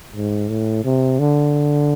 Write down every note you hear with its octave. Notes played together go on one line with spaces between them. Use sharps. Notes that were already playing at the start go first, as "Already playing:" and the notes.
G#2
A2
C3
D3